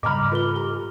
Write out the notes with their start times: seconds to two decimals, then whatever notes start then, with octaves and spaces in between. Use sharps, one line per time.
0.03 G#2 C#3 G3 D#5 A#5 B5 D6 F6
0.31 F4 A4 B4 B5 G7
0.56 G4 A#5